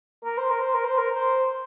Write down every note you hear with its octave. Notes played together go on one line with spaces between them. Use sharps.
A#4
C5
A#4
C5
A#4
C5
A#4
C5